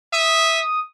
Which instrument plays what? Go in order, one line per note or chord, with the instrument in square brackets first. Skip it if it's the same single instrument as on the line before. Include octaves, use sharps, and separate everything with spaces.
[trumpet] E5 [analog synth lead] D#6